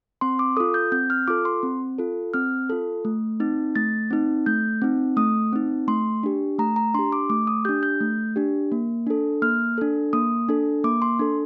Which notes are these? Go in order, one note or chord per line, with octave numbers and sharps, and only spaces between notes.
C4 C6
D6
F4 A4 D#6
G6
C4 G6
F6
F4 A4 D6
C6
C4
F4 A4
C4 F6
F4 A4
A3
C4 D#4
A3 A6
C4 D#4
A3 G6
C4 D#4
A3 D#6
C4 D#4
A3 C6
D4 G4
A3 A#5
A#5
D4 G4 C6
D6
A3 D6
D#6
D4 G4 G6
G6
A3
D4 G4
A#3
D4 A4
A#3 F6
D4 A4
A#3 D#6
D4 A4
A#3 D6
C6
D4 A4